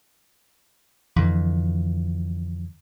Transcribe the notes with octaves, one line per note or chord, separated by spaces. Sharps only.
F2 D3 E3